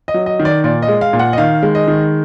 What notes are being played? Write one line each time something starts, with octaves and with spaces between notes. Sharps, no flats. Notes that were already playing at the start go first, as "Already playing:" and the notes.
D#5
F#3
D#5
D#3
D5
A#2 D5
D#5
G#3
F5
A#2
F#5
D#5
D#3 F5
G#3
D#5
D#3